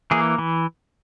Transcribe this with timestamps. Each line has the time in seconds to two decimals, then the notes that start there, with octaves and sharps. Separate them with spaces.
0.11 E3 A#3 G#4
0.38 E3